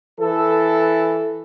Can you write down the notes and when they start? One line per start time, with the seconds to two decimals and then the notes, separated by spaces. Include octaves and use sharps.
0.20 E3 A4